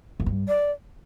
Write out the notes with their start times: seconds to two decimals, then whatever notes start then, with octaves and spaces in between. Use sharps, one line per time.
0.20 F#2
0.26 G2
0.48 D5